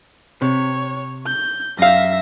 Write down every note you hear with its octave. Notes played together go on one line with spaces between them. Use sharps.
C3 C#5
G6
F#2 E5 F5 A#6